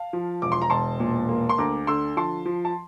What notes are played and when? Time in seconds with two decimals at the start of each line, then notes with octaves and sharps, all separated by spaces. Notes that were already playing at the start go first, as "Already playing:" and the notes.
Already playing: F5 A5
0.13 F3
0.42 E1 D6
0.52 C6
0.62 A#5
0.70 E1 A5 C6
1.00 A#2
1.29 A#3
1.49 C6
1.58 D2 A#5 D6
1.87 D3 C6 E6
2.17 F3 A5 C6
2.45 F3
2.65 A5